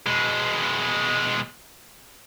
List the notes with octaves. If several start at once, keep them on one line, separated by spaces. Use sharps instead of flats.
B2 G#3